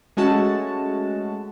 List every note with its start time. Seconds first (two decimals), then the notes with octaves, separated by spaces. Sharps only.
0.17 G#3 A3 C#4 F#4 A5